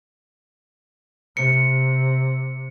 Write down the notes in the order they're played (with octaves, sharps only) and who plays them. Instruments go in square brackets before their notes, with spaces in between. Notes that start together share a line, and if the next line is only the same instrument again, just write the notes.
[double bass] C3 [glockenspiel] C#7